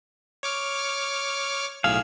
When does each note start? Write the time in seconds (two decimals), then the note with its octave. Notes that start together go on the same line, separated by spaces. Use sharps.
0.43 C#5 D6 F6
1.84 B1 A2 G#4 F5 E6